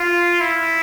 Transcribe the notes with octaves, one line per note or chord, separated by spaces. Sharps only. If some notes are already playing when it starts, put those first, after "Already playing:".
Already playing: F4
E4